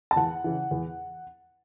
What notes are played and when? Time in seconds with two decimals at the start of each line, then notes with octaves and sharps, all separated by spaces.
0.11 A5
0.16 E2 F#5
0.44 C#3 E3
0.71 E2